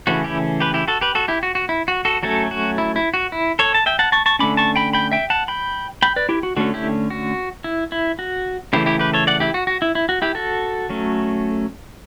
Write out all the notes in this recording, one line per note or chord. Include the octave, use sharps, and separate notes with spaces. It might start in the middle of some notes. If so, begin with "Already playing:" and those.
C#3 E3 A3 C#4 F#4
E4 G4
G4 B4
E4 G4
F#4 A4
G4 B4
F#4 A4
E4 G4
F#4
F#4
E4
F#4
F#4 A4
F#3 A3 C#4 F#4 A4
F#4
E4
E4
F#4
E4
A4 C#5
A5
E5 G5
F#5 A5
A5 C#6
A5 C#6
D3 A3 C#4 B5 D6
A5 C#6
G5 B5
G5 B5
E5 G5
F#5 A5
G5 B5
G5 B5
B4 D5
E4 G4
F#4
D3 A3 C#4 F#4
E4 G4
F#4
E4
E4
F#4
C#3 E3 A3 E4 G4
E4 G4
G4 B4
A4 C#5
D5 F#5
E4 G4
F#4
F#4
E4
E4
F#4
E4 G4
F#4 A4
F#3 A3 C#4